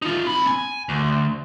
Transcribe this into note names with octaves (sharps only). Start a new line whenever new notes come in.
D#4 F4
C4 B5
G#5
D2